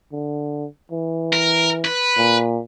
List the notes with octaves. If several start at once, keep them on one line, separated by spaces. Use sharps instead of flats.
D3
E3
A#4
B4
A#2